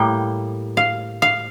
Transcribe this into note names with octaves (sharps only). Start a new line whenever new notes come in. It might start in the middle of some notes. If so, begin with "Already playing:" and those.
Already playing: A2 G3 A#3 G5
F5
F5